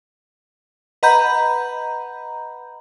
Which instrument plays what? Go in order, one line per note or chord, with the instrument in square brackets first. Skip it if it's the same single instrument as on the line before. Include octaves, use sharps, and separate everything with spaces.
[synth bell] B4 D#5 F#5 A#5 B5 G6